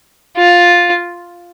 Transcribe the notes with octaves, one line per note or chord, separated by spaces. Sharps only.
F4